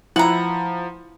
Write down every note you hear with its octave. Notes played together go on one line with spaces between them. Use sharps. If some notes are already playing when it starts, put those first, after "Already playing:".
F3 E4 F#5 A#5